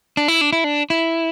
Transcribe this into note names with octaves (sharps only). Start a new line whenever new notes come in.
D4
E4
D4
E4
D4
E4